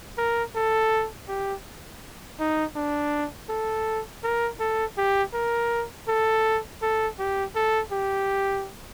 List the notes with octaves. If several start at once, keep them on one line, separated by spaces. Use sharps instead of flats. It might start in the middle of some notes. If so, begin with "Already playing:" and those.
A#4
A4
G4
D#4
D4
A4
A#4
A4
G4
A#4
A4
A4
G4
A4
G4